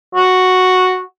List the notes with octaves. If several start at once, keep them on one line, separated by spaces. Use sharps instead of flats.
F#4